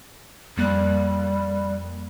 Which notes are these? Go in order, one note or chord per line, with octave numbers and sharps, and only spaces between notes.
F2 G3 A#3 F#6